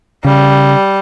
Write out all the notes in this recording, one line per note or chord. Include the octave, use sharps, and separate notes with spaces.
C#3 G3